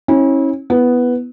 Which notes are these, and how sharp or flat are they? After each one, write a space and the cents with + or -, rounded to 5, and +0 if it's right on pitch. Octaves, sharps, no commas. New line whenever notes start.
C#4 -30 E4 -35
B3 +0 E4 +0